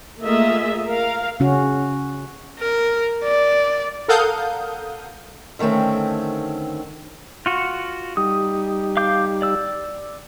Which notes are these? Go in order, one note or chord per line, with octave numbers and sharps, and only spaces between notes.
A3 A#3 F4 G#4 D#5 E5
A#4 F5
C#3 C#4 F#4
A#4
D5
A4 A#4 F5 F#5 D#6 G6
D3 D#3 A3 C4 C#4
F4 F#4
G3 D#4 G4 D#6
F5 D6 G6
D5 E6